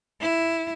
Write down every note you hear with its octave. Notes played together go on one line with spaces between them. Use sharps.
E4